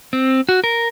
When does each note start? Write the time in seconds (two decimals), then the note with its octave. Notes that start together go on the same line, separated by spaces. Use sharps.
0.13 C4
0.49 F#4
0.64 A#4